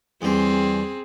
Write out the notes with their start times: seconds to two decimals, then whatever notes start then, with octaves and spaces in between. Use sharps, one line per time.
0.22 E2 G3 C4 G#4